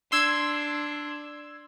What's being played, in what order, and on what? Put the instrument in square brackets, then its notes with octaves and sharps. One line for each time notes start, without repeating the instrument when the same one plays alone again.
[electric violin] D4 [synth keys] C6 E6 G#6